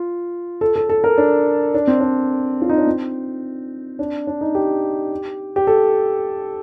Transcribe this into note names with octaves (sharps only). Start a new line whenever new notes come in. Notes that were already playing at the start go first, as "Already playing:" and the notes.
Already playing: F4
A4
A4
A4
A#4
D4
D4
C4
D4
F4
D#4
D4
C4
D4
D4
D#4
G4
G4
A4